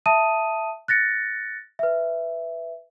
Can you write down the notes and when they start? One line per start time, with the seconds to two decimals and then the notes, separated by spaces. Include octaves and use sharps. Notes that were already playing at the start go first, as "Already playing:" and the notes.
0.06 E5 A5 D#6 D#7
0.88 F#6 A6 A#6 C#7
1.79 B4 E5